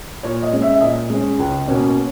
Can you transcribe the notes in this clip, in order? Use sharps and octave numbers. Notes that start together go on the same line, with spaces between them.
A#2 C#5
D#5
G#3 C#4
E5
E5
A#2 D#5
G#3 C#4
C#2
B2 A#3 C#4